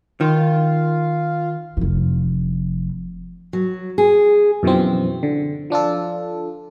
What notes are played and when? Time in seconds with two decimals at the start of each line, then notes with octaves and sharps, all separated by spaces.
0.21 D#3 F4
1.77 F1 F3
3.53 F#3
3.98 G#4
4.63 F#2 B2 E3 F3 C4
5.23 D3
5.70 F3 D4 F4 A4